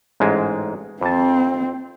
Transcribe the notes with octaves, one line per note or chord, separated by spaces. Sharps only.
A1 G#2 G#3
F2 C4 A5